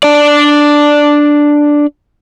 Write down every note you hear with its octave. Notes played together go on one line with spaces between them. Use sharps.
D4 D5